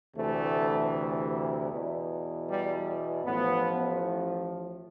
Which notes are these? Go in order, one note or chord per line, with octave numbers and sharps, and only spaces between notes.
D2 C3 E3 A3
E2 B2
G3
A1 A2 F3 B3